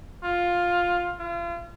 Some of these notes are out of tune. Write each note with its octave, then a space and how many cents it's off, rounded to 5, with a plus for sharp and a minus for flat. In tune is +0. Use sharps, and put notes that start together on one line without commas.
F4 +10
F4 -35